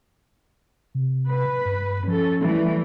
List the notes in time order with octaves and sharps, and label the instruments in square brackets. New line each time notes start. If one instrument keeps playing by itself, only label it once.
[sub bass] C3
[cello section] B4
[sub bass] G2
[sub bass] F3 [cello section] C#4 A4
[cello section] E3 G3 A3